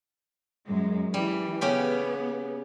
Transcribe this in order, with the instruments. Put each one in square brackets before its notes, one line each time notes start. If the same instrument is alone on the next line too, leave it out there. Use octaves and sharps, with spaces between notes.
[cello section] F#2 G#3
[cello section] E3 [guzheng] G3
[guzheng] C#3 C#4 G4 [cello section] B3